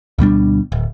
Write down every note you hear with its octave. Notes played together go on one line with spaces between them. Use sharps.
D2 B2 G3 D4
D1